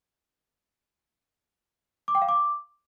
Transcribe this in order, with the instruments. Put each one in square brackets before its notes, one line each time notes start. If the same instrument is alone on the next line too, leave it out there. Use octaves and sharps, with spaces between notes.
[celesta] D6
G5
F5
D6